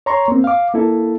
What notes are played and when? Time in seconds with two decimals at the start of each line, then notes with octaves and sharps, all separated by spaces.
0.06 C#5 A#5 C6 C#6
0.28 A#3 C4
0.44 F5 D6
0.74 A#3 E4 A4